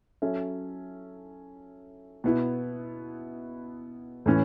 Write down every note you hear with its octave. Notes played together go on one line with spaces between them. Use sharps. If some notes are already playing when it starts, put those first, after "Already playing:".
F#3 C#4 A4 E5
B2 B3 E4
A2 E3 C#4